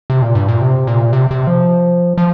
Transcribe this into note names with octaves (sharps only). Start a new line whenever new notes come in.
C3
A#2
G2
A#2
C3
A#2
C3
C3
F3
F3